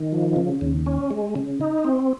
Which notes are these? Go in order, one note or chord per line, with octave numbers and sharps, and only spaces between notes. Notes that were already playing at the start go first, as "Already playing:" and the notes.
Already playing: D#3
F3
C#3
D#2
C#4
G#3
C#3
D#4
C4